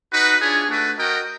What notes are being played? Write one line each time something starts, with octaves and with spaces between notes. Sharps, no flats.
D#4 F#4 B4
D4 F4 G#4 C#5
A3 D4 F#4 B4
F#4 A#4 D#5 G5